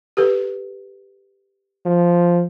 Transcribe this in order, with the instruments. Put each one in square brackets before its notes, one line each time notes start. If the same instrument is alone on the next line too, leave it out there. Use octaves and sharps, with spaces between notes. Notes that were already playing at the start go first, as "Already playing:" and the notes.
[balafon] G4 A4 B4
[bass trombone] F3